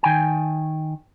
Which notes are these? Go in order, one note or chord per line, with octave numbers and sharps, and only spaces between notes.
D#3 G5 G#5